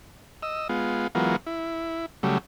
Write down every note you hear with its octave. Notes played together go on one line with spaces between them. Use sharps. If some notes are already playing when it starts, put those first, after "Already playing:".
D#5 E6
G#3 B3 F4
E3 F#3 G#3 B3 F4 A#4
E4
C#3 F#3 G3 A3